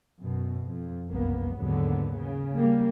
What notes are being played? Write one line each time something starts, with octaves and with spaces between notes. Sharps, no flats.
F#2 B2
F2
F#1 C2 A#3 B3
D#2 G#2 D3 F#3 B3
C#3
G3 A#3